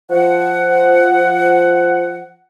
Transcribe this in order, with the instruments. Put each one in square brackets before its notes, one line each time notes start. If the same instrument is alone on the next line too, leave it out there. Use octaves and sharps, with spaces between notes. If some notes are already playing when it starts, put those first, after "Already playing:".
[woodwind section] F3 F#5